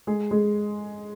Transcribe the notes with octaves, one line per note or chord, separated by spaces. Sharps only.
G#3 G#4
G#3 G#4